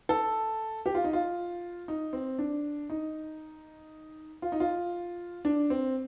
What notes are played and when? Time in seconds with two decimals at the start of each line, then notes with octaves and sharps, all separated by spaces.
0.09 A4
0.86 G4
0.95 F4
1.04 D#4
1.13 F4
1.88 D#4
2.13 C4
2.39 D4
2.90 D#4
4.42 F4
4.52 D#4
4.60 F4
5.45 D4
5.70 C4